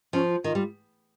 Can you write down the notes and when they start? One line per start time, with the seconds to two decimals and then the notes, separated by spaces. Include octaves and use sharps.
0.13 F3 C#4
0.29 F4
0.44 D#3 F4
0.55 G3